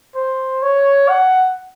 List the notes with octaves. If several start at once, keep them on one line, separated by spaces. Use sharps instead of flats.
C5
C#5
F#5